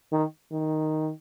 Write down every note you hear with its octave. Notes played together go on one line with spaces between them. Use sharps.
D#3
D#3